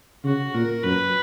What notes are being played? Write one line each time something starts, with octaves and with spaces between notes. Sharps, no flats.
C#3 F#4
A#2 A#4
F#2 B4